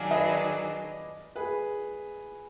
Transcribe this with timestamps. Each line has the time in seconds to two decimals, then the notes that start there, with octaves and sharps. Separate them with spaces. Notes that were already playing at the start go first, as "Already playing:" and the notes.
Already playing: D#3 F#3 D4 G#4 D5 F5
0.11 B4 D#5
1.36 G#4 B4